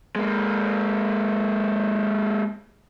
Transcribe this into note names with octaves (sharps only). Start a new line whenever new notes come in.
G#3 A#3